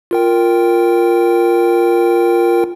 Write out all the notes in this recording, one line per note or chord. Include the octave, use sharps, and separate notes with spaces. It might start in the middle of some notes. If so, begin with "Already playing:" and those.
F4 A#4 G5